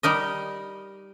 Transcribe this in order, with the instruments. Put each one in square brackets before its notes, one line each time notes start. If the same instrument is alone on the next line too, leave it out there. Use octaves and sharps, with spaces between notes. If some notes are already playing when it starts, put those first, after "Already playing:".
[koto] G3 D#4 A#4 D#5